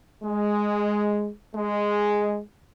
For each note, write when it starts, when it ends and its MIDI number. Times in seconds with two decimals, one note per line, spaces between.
0.24 1.30 56
1.56 2.40 56